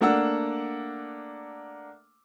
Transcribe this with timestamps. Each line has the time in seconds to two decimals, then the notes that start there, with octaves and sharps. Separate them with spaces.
0.01 A3 A#3 D4 F#5 E6